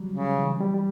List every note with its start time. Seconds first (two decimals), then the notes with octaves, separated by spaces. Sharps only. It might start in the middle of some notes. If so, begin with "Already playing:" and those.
Already playing: F#3 G3
0.09 C#3
0.38 E3
0.61 G3
0.74 G3